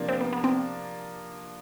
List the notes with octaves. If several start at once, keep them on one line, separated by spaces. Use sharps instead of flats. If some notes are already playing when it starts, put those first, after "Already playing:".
Already playing: C3 F3 A#3 D4
C4
B3
B3
C4